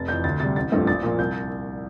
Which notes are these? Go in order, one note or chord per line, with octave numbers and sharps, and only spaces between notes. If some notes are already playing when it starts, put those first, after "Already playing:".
Already playing: F1 A6
F2 E3 G6
D2 A6
C3 G3 A6
A1 A6
G2 F3 A3 C4
A#1 A6
A#2 F3
C2 G6